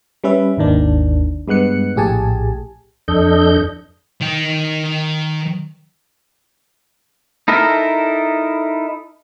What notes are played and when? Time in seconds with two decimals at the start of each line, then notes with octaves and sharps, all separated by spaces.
0.24 G3 C#4 B4 E5
0.57 G#1 D#2 D#3 D4
1.48 G2 G#3 B3 F#6 C#7
1.96 A#1 A2 G4 G#4 G#5 A5
3.08 F2 D4 A4 D#5 G6
4.21 D#3 G5
7.48 D#4 E4 A4 A#4